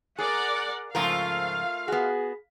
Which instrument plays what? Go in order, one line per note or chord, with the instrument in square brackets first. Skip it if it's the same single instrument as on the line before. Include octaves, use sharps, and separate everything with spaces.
[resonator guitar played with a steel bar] G#4 [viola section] A#4 D5 F#5
[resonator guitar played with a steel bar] G#2 C#3 F3 [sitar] A3 F4 A#4 [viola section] F5
[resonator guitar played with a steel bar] B3 F#4 [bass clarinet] G#4